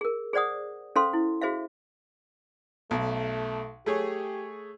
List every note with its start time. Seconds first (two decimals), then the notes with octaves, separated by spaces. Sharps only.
0.01 G#4 A#4
0.33 G#4 C5 D5 F#5 D#6
0.96 C#4 A4 C5 F5 C6
1.13 E4
1.42 F#4 G#4 C5 E5 F5
2.91 B1 A3
3.86 A3 G4 G#4 C#5